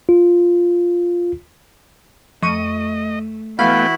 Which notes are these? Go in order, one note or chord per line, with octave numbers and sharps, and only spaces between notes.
F4
F2 A3 D#5 C#6 D#7
E3 A3 B3 E4 F#4 F5 G5 B5